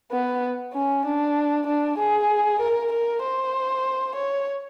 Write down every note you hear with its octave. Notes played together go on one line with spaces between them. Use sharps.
B3
C#4
D4
D4
G#4
A#4
A#4
C5
C#5